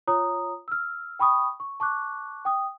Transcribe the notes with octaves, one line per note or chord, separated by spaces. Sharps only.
F4 C#5 A#5 D#6
E6 F6
G5 B5 C#6 D#6
C#6
A5 C#6 D6 F#6
G5 D#6